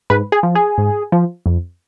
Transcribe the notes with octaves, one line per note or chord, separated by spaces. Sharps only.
G#2 B4
G#4
F3
G#4
G#2
F3
F2